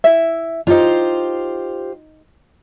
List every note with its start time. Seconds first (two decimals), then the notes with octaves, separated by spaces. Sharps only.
0.04 E4 E5
0.67 D4 D#4 F4 G4 C5